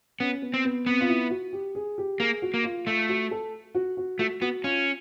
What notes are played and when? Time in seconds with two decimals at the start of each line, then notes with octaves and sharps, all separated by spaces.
0.20 B3 C#4
0.42 B3
0.54 C4
0.65 B3
0.86 B3 C4
1.01 F4
1.09 E4
1.31 F#4
1.53 G4
1.75 G#4
1.98 G4
2.20 A#3 G#4
2.42 F#4
2.54 A#3
2.64 F4
2.86 A3 F4
3.09 F#4
3.31 A4
3.75 F#4
3.97 F#4
4.19 A3 F#4
4.41 B3 F#4
4.64 C#4 F4